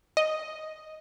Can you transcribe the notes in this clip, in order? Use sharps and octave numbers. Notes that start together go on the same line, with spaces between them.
D#5